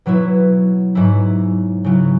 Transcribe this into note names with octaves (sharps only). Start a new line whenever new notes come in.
B2 F#3 B3 E4
G#2 F#3 E4
C#3 F#3 E4